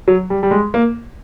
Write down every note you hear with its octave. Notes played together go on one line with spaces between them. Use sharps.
F#3
G3
G3
G#3
A#3